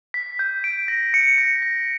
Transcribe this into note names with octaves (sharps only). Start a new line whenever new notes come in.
B6
G6
D7
A#6
C#7
A#6
A#6